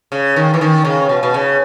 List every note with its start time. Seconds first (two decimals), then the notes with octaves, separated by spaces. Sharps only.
0.12 C#3
0.36 D#3
0.54 E3
0.61 D#3
0.85 C#3
1.09 B2
1.23 B2
1.34 C#3